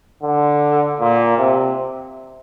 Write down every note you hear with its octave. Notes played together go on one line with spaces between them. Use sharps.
D3
A#2
C3